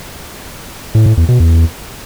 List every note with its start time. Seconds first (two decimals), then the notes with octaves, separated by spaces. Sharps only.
0.95 A2
1.06 A2
1.17 E2
1.29 B2
1.40 E2